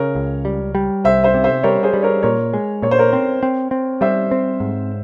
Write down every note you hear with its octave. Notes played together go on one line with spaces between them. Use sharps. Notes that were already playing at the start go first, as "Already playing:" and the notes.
Already playing: C#3 A#4 C#5
C#2
G3
G3
C2 C5 E5
C5 E5
C3
C5 E5
G3 A#4 C#5
G#4 C5
G3
A#4 C#5
A#2 A#4 C#5
G#3
A#2 C#5
C5
A#4 C#5
C4
C4
C4
G3 C5 E5
C4
G#2